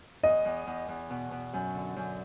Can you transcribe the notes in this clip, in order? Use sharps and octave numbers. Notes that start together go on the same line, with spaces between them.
E2 D#5
E2
E2
E2
B2
B2
F#2
D3
F#2